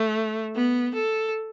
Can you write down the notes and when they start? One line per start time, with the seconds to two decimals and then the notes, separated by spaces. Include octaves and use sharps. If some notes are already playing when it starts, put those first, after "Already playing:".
Already playing: A3
0.55 B3
0.95 A4